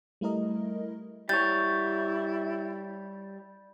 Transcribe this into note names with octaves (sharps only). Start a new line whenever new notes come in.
G3 A3 E4 A#4 D#5
G3 E4 C#5 G6 A6